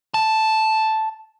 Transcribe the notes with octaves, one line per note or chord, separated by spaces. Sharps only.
A5